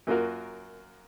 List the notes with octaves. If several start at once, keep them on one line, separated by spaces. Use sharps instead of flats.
F#2 A#3 F4 F#4 A#4